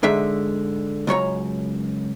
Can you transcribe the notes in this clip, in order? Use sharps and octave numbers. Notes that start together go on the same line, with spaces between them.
G#2 D3 G#3 E5
C#2 F#2 C#5 A#5